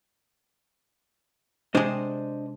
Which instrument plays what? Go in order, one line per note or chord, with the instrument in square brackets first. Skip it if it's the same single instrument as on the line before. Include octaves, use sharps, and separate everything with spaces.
[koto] C3 G#3 [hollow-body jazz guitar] D4 C5 D#5